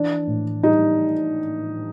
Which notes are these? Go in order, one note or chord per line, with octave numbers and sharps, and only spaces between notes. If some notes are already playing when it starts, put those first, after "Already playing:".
Already playing: E3 D4
A2
G3 D#4